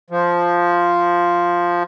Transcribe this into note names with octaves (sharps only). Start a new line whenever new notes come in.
F3